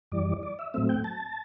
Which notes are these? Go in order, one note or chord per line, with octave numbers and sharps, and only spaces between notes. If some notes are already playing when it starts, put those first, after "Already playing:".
F#2 E3 G3 D5
D5
E5
A2 F#3 A3 C4 E5
G5
A5